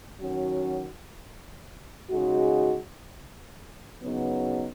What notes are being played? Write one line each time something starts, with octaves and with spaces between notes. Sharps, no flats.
D#3 F#3 C#4 F#4
C#3 G#3 D#4 F#4
C#3 F#3 B3 D#4 F#4